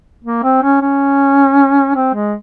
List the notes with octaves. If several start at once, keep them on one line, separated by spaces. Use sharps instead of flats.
A#3
C4
C#4
C#4
C4
G#3